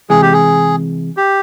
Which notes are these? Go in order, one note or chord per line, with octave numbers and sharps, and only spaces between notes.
C3 E3 G#3 G#4
G4
G#4
G4